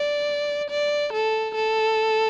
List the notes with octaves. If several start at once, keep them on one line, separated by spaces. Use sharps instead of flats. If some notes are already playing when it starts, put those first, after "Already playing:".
Already playing: D5
D5
A4
A4